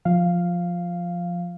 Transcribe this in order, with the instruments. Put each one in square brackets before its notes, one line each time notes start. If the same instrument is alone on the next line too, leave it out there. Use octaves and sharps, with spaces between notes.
[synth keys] F3 F5